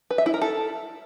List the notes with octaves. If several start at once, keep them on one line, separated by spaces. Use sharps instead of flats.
B4
E5
E4
A#4
A4